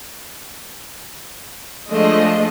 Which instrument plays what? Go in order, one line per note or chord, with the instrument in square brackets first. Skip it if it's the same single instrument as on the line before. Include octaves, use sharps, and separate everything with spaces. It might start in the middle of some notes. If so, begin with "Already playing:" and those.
[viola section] F3 G#3 A3 D4 D#5